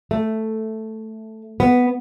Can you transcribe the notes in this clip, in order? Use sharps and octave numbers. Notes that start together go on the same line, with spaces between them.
A3
B3